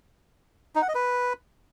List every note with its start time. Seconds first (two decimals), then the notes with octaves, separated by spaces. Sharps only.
0.75 D#4
0.82 F#5
0.88 D#5
0.95 B4